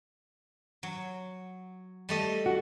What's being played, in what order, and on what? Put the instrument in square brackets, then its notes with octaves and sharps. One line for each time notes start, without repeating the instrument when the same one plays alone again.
[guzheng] F#3
G3 A3 D#5
[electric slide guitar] F#4